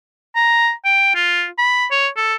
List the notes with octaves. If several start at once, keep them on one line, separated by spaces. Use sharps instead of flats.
A#5
G5
F4
B5
C#5
A4